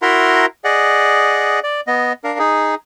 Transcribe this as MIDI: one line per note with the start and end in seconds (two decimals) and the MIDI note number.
0.02 0.46 64
0.02 0.46 66
0.02 0.46 70
0.02 0.46 76
0.02 0.46 82
0.02 0.46 84
0.64 1.60 68
0.64 1.60 74
0.64 1.60 75
0.64 1.60 78
1.64 1.81 74
1.87 2.13 59
1.87 2.13 75
2.24 2.39 62
2.24 2.39 70
2.24 2.39 77
2.39 2.75 63
2.39 2.75 68